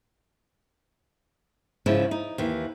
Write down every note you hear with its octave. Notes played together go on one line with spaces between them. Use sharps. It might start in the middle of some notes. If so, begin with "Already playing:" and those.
G#2 C#3 F3 E4
D#4
D#2 E3